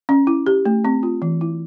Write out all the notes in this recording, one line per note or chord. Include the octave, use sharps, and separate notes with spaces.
C#4
E4
G4
A3
C4
F4
E3
E4